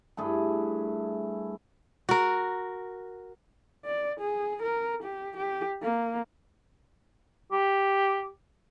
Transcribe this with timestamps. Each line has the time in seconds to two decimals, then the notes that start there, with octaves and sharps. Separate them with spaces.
0.17 G2 A3 E4 G#4
2.09 F#4 A#4
3.85 D5
4.20 G#4
4.62 A#4
5.03 G4
5.37 G4
5.83 A#3
7.52 G4